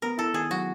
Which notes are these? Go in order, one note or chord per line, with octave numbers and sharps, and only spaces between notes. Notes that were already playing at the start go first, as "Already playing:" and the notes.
B3 A#4
E4 A4
D#3 G#4
F#3 F#4